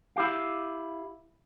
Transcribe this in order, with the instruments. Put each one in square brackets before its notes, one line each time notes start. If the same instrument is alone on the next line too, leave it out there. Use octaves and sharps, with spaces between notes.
[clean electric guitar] E4 G4 F5